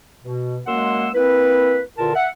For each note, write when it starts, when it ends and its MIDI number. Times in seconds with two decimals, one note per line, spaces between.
0.23 0.59 47
0.67 1.08 42
0.67 1.08 56
0.67 1.08 58
0.67 1.08 78
0.67 1.08 84
0.67 1.08 88
1.14 1.80 58
1.14 1.80 60
1.14 1.80 64
1.14 1.80 71
1.98 2.14 40
1.98 2.14 46
1.98 2.14 50
1.98 2.14 65
1.98 2.14 70
1.98 2.14 81
2.14 2.27 76
2.14 2.27 78